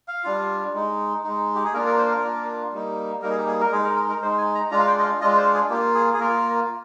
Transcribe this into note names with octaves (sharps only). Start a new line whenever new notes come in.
F5
G3 D4 F4
G#3 D#4
G#3 D#4
G4
G#4
A#3 D4 F4 A#4
A#4
C5
A#4
A#3 D4 F4
G3 A#3 D#4
G3 A#3 D#4 A#4
G#4
G4
G#4
A#4
G#3 D#4 G#4
A#4
A#4
A#4
G#3 D#4 C5
G#5
A#5
G#3 D4 F4 A#5
F5
G5
D#5
F5
G#3 D4 F4 D#5
C5
G#4
A#3 F4 G4
G#4
G#4
A#3 F4 A#4